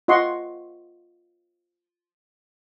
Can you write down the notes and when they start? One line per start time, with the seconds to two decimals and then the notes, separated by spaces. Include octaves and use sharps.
0.08 F4 D#5 F#5 C6 C#6